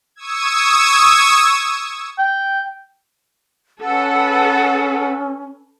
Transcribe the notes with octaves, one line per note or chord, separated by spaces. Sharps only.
C#6 D#6 E6 G#6
G5
C#4 A4 B4 F#5